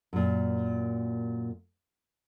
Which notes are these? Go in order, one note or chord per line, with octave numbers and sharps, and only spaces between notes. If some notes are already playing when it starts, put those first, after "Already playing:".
F#2 A#2